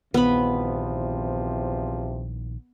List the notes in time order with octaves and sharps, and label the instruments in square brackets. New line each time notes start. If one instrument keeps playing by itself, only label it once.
[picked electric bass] A#1 D#3 [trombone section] E2 C3 F3 [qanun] B3 B5